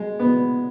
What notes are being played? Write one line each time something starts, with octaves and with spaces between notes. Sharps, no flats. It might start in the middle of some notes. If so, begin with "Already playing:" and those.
Already playing: G#3
B3